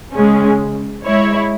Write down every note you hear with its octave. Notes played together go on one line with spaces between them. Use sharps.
C#3 G#3 C#4
G#3 E4 C#5